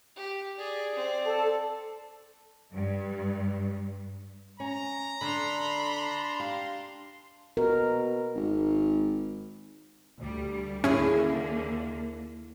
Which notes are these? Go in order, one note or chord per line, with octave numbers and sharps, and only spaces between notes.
G4
G#4 D5
C4
A4 A5
G2
C#4 A#5
D3 D4 B5 C6
G4 F5
B2 A#4
G#1
D2 G3
D#2 D3 A#3 C#4 E4 G#4